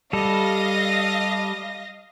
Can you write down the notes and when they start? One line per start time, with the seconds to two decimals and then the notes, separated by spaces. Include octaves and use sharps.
0.13 G3 A4 D#5 F5 A#6